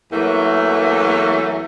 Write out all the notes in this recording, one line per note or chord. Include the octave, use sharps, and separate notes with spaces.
E2 E3 F#3 A3 A#3